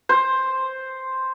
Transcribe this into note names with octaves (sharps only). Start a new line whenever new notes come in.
C5